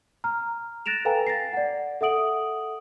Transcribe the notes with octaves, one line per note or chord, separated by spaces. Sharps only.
A#5 F6
F#6 A6 A#6 D7 E7 F7
A4 B4 F5 G5 G#5 A#5
A6 A#6 C7
D5 F#5
A4 E5 F#5 D#6 D7 F#7